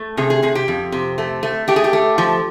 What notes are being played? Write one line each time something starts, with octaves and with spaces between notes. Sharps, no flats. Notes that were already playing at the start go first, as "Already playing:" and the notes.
Already playing: A3
C3 G#4
G#4
C3 G#4
G4
F2
C3
A3
A3
A3 G4
G#4
G4
A3
F3